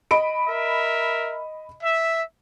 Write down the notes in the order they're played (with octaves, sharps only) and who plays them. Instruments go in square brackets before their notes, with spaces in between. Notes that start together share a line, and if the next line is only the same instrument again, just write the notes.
[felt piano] D#5 B5 D7
[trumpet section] A#4 E5
E5